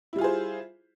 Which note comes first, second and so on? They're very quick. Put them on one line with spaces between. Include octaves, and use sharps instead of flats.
E4 G3 F4 G#4 C5